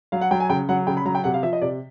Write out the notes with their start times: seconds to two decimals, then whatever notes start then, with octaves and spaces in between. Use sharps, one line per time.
0.12 F#3 F5
0.21 F#5
0.31 F#3 G5
0.40 G#5
0.50 C#3 G5
0.69 F#3 F#5
0.87 C#3 G5
0.97 B5
1.05 F#3 A#5
1.15 G5
1.24 C3 F#5
1.34 F5
1.43 F3 E5
1.53 D#5
1.61 C3 D5